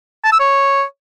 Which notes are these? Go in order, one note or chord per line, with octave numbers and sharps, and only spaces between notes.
A5
E6
C#5